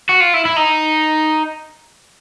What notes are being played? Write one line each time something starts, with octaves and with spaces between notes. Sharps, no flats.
F#4
F4
E4
E4
D#4